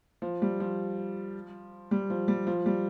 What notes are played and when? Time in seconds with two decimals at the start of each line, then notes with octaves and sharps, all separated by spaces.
0.22 F3
0.42 G3
0.60 F3
1.91 G3
2.10 F3
2.28 G3
2.47 F3
2.66 G3